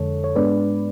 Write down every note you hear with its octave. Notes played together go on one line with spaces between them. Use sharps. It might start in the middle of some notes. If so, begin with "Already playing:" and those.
Already playing: F2 D3 G#3 A4 C#5
C#5
G#2 G#3 B3 D4 B4 D5